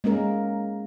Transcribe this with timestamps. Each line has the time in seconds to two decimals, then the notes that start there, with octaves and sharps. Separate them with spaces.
0.04 G#3 A#3 C#4 A#4